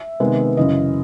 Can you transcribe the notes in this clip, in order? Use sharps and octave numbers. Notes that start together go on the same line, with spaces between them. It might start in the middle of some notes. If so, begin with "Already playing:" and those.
Already playing: E5
C3 D#3 G#3 B3
F#2 C#3 E3 D#5